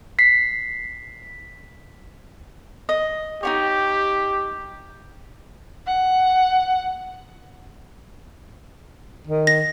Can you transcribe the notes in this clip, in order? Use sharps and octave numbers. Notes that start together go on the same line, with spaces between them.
B6 C7
D#5
D#4 F#4 G4 C#5
F#5
D#3
A#6